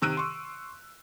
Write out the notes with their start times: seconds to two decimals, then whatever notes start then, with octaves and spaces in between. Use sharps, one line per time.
0.02 C3 D#3 E6 F#6 D7 D#7
0.17 C6 C#6